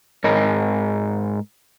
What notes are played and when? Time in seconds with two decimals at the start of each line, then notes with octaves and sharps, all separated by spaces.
0.24 G#2 A#4 C#5 D#5